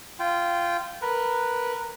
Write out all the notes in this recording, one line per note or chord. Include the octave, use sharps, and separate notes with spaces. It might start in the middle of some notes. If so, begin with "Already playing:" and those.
F4 G5
A#4 B4